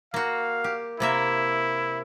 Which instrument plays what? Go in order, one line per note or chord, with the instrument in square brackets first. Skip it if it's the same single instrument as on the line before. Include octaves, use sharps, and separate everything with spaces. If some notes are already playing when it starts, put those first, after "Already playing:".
[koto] A#3 F#4 [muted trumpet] F5
[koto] G4
[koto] C3 A#3 E5 [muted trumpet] E4